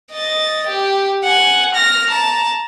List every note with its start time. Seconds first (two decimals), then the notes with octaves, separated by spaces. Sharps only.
0.12 D#5 A6
0.66 G4
1.24 F#5 G#5
1.74 F6 A#6
2.09 A5 A#5